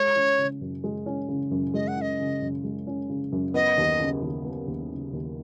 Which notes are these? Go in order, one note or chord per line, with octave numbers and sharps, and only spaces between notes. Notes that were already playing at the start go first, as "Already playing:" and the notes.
Already playing: G#3 C#5
C#4
C#3
F#2
G#3
C#4
C#3
F#2
G#3 D#5
F#5
C#4 D#5
C#3
F#2
G#3
C#4
C#3
F#2
B3 D#5
D#2
C#3
D#2
B3
D#2
C#3
D#2